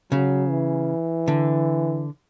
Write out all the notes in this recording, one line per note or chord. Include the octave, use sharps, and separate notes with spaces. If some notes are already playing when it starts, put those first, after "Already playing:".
C#3 F#3
E3
D3